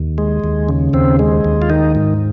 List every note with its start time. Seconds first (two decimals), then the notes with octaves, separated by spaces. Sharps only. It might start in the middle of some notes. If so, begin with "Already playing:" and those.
Already playing: D#2
0.18 G#3
0.44 D#2
0.69 C#3
0.93 D#2 C4
1.19 G#3
1.45 D#2
1.62 F4
1.70 D#3 D#4
1.95 G#2